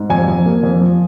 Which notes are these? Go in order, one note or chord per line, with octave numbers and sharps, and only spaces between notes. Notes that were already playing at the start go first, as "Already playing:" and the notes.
Already playing: G#2
F2 G#5
F2
A#3
F2
F3